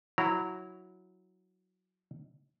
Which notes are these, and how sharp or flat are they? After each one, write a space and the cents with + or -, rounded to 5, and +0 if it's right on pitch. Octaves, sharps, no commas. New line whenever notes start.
F#3 +0 E4 +0 A#5 -15